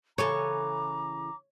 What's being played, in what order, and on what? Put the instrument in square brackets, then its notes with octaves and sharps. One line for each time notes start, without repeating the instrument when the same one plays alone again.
[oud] C#3 E3 A4 [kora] C#5 [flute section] A#5 D6